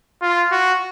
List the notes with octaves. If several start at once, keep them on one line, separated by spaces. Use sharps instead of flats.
F4
F#4